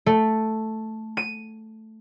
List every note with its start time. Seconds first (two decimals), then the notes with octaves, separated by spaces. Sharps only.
0.06 A3
1.17 D#7